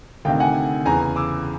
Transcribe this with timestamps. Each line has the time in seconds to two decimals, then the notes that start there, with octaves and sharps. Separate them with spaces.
0.25 D2 C3 D#3 F5 G5
0.40 F#5 G#5
0.85 E2 C#3 E3 G#5 A#5
1.16 D6 E6